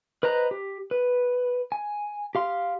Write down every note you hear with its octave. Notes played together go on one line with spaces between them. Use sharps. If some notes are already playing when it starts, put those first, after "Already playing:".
B4 C5 D#5 A#5 F#6
G4
B4
G#5
G4 F5 C6